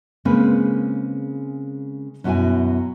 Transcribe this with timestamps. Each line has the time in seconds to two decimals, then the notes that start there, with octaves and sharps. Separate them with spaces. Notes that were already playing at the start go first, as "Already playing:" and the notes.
0.25 C#3 G#3 A#3 C4 B4
2.24 F#2 B2 F#3 E4 G#5